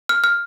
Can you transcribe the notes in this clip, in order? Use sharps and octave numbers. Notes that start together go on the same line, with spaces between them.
F6
F6